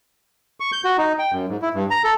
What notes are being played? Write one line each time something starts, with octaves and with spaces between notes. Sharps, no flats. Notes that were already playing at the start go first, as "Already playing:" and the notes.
C#6
G6
F#4
D#4
G5
F#2
G#2
E4
G2
A#5
A4